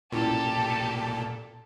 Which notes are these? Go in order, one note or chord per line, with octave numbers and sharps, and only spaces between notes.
A#2 C#4 E4 F4 G4 A4 A5